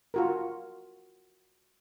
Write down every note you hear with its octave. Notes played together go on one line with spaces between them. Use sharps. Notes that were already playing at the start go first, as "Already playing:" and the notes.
F4 F#4 A#4